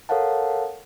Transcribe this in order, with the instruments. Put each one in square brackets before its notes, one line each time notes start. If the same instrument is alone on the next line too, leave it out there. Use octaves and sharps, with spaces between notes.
[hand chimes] A4 A#4 C#5 F5 F#5 A5